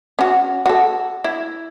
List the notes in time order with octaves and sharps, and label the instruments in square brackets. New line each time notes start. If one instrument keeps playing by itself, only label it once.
[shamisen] C#4 F#4
F#4 A4
E4